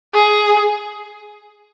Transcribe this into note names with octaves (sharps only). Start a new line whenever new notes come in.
G#4